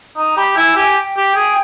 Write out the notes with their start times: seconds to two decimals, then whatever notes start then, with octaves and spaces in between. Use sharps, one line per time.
0.17 D#4 A#5
0.37 G4 B5
0.56 E4 G#5
0.76 G4 G#5
0.97 G5
1.17 G4
1.36 G#4